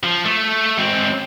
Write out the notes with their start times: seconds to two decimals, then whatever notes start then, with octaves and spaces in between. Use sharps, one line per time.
0.03 F3
0.25 A3
0.78 G#2 C4